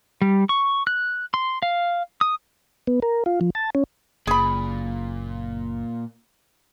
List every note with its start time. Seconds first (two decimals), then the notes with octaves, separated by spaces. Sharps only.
0.22 G3
0.49 C#6
0.87 F#6
1.34 C6
1.63 F5
2.21 D#6
2.87 B3
3.02 A#4
3.26 F4
3.41 F3
3.55 A5
3.75 C#4
4.27 F#1 A#2 G#4 B5